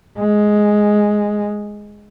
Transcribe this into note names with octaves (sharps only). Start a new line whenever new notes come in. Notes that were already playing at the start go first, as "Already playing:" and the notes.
G#3